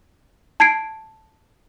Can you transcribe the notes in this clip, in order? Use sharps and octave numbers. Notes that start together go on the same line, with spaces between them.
A5 G#6 C7 D7